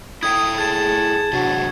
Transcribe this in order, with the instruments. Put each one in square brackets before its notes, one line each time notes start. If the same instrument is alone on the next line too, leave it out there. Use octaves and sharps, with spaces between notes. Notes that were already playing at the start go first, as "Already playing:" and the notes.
[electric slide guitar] E4 A4 G5 [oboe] D#6 [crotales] G#6
[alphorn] G#4 [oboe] A5 [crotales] G#6
[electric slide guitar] C3 F#3 D4 [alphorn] F#4